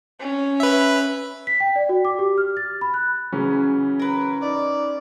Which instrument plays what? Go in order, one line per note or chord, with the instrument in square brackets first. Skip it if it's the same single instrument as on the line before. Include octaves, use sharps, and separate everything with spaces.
[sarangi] C#4
[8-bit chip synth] B4 E5
[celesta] B6
G5
D5
F#4
D6
G4
F6
A6
B5
F#6
[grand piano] C#3 E3 F#3 [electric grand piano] C#4
[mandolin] A#4 B4
[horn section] D#4 D5